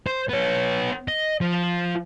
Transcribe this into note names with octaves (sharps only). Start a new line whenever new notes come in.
C5
B3 C#5
D#5
F3